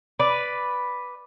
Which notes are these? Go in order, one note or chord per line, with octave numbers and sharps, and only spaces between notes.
B4 D5